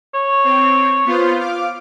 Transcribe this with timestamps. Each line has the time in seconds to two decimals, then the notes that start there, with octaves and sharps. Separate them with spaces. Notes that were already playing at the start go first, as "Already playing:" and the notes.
0.15 C#5
0.44 C4
1.05 B3 F4 C5
1.38 F5 D6